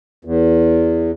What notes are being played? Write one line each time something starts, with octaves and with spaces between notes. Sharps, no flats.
E2